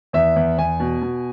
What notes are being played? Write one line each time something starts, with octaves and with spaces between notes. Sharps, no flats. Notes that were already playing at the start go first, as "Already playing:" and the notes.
E2 E5
E2
E2 G#5
B2
B2